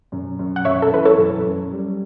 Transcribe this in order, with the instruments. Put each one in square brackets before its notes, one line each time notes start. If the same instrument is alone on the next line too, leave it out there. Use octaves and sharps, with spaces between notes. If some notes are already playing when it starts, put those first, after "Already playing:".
[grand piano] F#2
F#2
[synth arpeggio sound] F#5
[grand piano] F#2 [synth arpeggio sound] C#5 E5
[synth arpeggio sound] A4
[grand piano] E3 [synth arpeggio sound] B4
[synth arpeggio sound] A4 C#5
[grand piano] F#2
F#2
G3